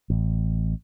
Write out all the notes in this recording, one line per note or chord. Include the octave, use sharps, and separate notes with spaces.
A1